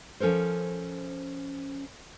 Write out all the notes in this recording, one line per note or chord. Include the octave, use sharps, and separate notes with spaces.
F3 C#4 A4 A#4 C5